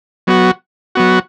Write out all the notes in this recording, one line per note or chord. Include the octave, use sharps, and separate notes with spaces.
F#3 B3 F#4
F#3 B3 F#4